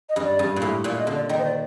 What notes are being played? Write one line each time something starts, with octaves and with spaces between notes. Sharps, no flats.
D#5
G2
D5
G2
A#2
A2
A#2 D5
D#5
D3
D5
D#3 D#5
C5
D5